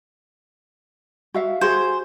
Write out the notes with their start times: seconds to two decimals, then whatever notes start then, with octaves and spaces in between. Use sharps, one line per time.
1.34 F#4 E5 F5
1.61 F#4 G#4 C5